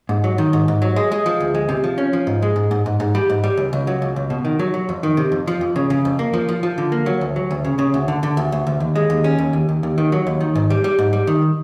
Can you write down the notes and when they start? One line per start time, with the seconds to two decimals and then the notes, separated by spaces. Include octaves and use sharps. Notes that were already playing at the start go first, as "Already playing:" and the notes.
0.09 G#2
0.24 F#3
0.38 D#3
0.53 G#2
0.68 G#2
0.82 F#3
0.96 G#3
1.12 G#3
1.26 F3
1.40 D2
1.55 G#3
1.69 C3
1.84 F3
1.98 C#4
2.13 F3
2.27 G#2
2.42 G#3
2.56 G#2
2.71 G#2
2.86 G#2
3.00 G#2
3.15 G3
3.30 G#2
3.44 G3
3.57 C#2
3.73 C#2
3.87 F#3
4.02 C#2
4.16 C#2
4.30 B2
4.45 D#3
4.59 F#3
4.74 F#3
4.89 F2
5.03 D#3
5.17 C3
5.32 F2
5.47 F3
5.61 F2
5.76 C#3
5.90 C#3
6.05 F2
6.19 A#3
6.34 F3
6.49 F3
6.63 F3
6.78 D3
6.92 A#3
7.06 F#3
7.21 D2
7.36 F#3
7.51 D2
7.65 C#3
7.79 C#3
7.94 D2
8.08 D3
8.23 D3
8.37 D2
8.52 D2
8.67 D2
8.80 D#2
8.95 G#3
9.10 D#2
9.24 C#4
9.39 D#2
9.53 D#2
9.69 D#2
9.83 D#2
9.98 D#3
10.12 F#3
10.27 D#2
10.41 D#3
10.55 G#2
10.70 G3
10.84 G3
10.99 G#2
11.13 G3
11.27 D#3